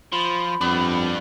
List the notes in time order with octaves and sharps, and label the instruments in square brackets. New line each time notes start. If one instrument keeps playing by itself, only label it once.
[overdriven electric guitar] F3 [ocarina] B5
[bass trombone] F2 [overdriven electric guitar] G3 D4 [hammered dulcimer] B3